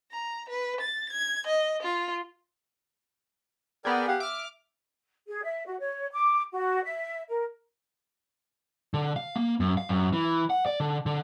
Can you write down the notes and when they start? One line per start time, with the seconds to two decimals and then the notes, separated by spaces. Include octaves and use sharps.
0.12 A#5
0.49 B4
0.81 A6
1.12 G#6
1.47 D#5
1.83 F4
3.85 B3 G#4 A#4 D5 G5
4.08 G4 F5 F#5
4.20 E5 D6 F6
5.28 G#4
5.43 E5
5.66 F#4
5.79 C#5
6.11 D6
6.52 F#4
6.83 E5
7.29 A#4
8.94 D3
9.16 F5
9.36 A#3
9.60 F#2
9.77 F5
9.89 F#2
10.13 E3
10.50 F#5
10.66 D5
10.80 D3
11.06 D3